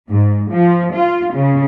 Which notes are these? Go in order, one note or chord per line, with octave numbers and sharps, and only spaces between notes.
G#2
F3
F4
C#3